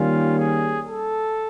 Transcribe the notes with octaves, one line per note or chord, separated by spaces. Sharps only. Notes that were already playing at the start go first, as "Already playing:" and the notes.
Already playing: D#3 G3 A#3 C#4 F4
G#4
A4